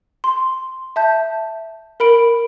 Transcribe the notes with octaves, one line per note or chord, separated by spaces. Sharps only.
C6
E5 A5 G6
A#4 B5 D7